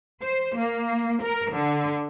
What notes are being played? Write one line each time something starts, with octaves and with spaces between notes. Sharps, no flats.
C5
A#3
A#4
D3